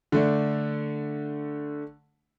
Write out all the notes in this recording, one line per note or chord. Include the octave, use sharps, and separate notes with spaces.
D3 A3 D4